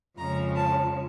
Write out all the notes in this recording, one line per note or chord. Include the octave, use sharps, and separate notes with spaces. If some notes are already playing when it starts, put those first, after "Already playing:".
F2 C#3 F3 G#3 C#4 A#5
A5